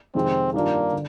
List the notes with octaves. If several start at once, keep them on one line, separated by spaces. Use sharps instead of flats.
F2 C3 D#3 G#3 C4
G2 D#3 G3 A#3 D4 F4
D3